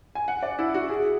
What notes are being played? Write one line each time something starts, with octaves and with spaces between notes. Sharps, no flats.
G#5
F#5
D5
E4
F#4
G#4